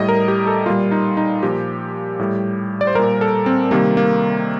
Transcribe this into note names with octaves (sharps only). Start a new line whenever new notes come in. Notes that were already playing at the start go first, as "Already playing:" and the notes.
Already playing: A2 G3 D#5
A#4
G4
A4
A#2 G3 F4
D#4
D#4
A#2 F3 G4
A2 G3
D5
C5
A#2 G3 A#4
A4
C4
C3 D#3 G3 A#3
A#3